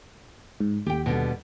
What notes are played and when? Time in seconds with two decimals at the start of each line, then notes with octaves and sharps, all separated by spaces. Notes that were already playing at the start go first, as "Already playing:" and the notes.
0.60 G#2
0.86 D#2 G4 G5
1.06 B2 D3 G3